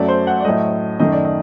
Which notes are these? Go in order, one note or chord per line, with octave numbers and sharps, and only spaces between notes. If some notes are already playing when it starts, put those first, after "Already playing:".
Already playing: F#2 F#3 A3 D5
C5
F#5
D5
A2 F#3 A3 D#5
F#2 D#3 A3 D#5
D5
D#5